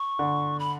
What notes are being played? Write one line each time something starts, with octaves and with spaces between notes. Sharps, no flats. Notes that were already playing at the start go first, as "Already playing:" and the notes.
Already playing: C#6
D3
B5